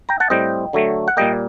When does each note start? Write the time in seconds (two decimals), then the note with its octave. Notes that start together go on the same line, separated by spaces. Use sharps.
0.09 G5 A#5
0.20 F#5 A5
0.30 A2 G3 C4 D#5 G5
0.73 D3 F#3 A3
1.08 F#5
1.17 A#2 G3 A#3 D#5 G5